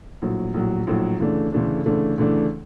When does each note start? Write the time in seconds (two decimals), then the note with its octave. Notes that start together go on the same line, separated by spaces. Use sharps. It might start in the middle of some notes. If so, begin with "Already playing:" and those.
0.22 A#1 A2 F#3
0.54 A#1 A2 F#3
0.87 A#1 A2 F#3
1.20 D2 C#3 E3 A3 D4
1.52 D2 C#3 E3 A3 D4
1.86 D2 C#3 E3 A3 D4
2.18 D2 C#3 E3 A3 D4